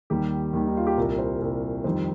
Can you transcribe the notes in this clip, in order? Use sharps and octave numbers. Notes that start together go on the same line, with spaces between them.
D#2 D#3 G3 G4
D#2 D#3 G3
D#4
F4
G4
C2 A#2 G3 A#4
C5
C2 A#2 G3
F2 D#3 G3 C5